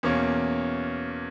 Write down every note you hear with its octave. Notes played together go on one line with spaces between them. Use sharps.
E2 B2 A#3 C#4